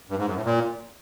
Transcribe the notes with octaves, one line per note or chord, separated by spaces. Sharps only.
G2
G#2
F#2
A2
A#2